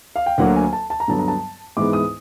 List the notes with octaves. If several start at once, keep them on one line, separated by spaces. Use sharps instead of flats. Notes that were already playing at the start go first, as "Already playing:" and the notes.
F5
G5
D2 D3 F#3 A#3 F#5
G#5
A5
A5
A#5
G2 D3 F#3 B3 A5
A#5
A5
G#2 E3 G#3 B3 D6
D#6